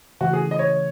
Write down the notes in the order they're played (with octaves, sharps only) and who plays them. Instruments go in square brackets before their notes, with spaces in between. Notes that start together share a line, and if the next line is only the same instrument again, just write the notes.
[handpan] C#3 E3 A3 [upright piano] F#4
[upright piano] G#4
D#5
C#5